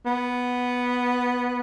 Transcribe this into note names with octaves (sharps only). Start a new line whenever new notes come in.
B3